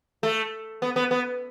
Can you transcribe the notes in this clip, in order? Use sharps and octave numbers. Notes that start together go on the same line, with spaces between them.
A3
B3
B3
B3